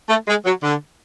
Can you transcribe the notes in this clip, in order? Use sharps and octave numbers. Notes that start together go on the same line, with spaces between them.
A3
G#3
F#3
D3